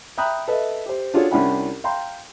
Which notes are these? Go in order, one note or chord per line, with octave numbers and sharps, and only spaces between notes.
E5 G5 A#5 B5 D#6 F#6
A4 B4 D#5 E5
G4 C5
D4 F4 F#4 G#4 A4 C#5
C2 C#4 D4 E4 F#5 B5
F5 G5 A#5 C6